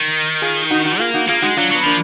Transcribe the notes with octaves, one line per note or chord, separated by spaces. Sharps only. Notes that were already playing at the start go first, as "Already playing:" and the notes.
Already playing: D#3
F4 G#4
D#4 F#4
D#4 F#4
A#3 F4 G#4
D#4 F#4
A#3 F4 G#4
G#3 D#4 F#4
F#3 D4 F4
F#3 B3
F3 A#3 D4